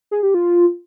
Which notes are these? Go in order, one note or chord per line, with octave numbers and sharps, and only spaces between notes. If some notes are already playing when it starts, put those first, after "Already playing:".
G#4
G4
F4